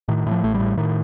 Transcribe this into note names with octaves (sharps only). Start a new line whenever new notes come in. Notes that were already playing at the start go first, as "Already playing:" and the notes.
A2 D#3
A2 F3
A1 A3
G3
A2
A2 D#3